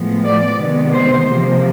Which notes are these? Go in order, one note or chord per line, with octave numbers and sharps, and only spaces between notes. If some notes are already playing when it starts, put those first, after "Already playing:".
Already playing: A2 F3 G#3 B3
D5
C3 D#3 G#3 B3
C5
C3 F3 A#3